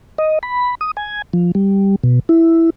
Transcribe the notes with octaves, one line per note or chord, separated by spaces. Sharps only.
D#5
B5
D#6
G#5
F3
G3
B2
E4